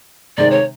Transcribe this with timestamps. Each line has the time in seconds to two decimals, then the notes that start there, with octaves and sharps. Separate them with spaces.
0.37 C3 D#3 G#3 C4 D5
0.51 C#5